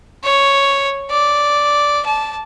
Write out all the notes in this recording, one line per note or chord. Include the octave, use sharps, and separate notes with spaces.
C#5
D5
A5